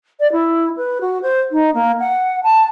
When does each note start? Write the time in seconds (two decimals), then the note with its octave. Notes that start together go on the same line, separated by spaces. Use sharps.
0.20 D5
0.32 E4
0.77 B4
1.01 F#4
1.22 C5
1.52 D#4
1.74 A#3
1.99 F#5
2.43 A5